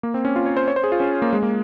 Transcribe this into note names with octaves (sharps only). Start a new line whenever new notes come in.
A#3
C4
C#4
F4
C#5
C5
C#5
C5
G#4
F4
C#4
A#3
G#3
A#3